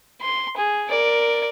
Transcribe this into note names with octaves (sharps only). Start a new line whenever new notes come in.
C6
G#4
A#4 D5